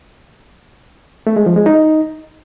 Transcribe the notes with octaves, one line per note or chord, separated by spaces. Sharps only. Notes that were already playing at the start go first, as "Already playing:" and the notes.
A3
G#3
F3
G#3
D#4